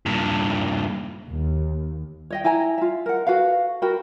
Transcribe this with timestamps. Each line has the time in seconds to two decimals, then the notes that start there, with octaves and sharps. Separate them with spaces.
0.06 G2 A#2
1.27 D#2
2.30 C#5 D#5 G5
2.44 E4 G5 G#5 A#5
2.78 F4 E5
3.06 A#4 F#5
3.27 F#4 A4 B4 F5
3.82 F#4 A#4 G5 B5